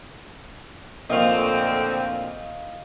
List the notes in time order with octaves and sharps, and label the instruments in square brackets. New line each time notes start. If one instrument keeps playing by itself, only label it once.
[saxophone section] D2 D3 C4 [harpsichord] A#2 F3 [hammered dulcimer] D#5 F5 C#6